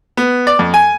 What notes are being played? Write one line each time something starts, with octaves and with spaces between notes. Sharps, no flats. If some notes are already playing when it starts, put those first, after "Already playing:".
B3
D5
F2
G#5